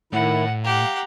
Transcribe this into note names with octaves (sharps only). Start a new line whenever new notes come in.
A2 D#3 E4 F#5
G4 F5 F#5 A#5